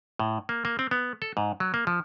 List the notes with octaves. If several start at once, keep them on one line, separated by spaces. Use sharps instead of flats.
A2
A#3
A#3
C4
B3
A4
G#2
F#3
A#3
F3